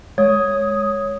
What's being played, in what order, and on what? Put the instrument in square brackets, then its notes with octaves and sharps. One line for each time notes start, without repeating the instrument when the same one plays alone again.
[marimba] G#3 [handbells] C#5 [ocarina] D#6